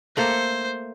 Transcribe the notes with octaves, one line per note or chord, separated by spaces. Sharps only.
A3 A#3 A4 C5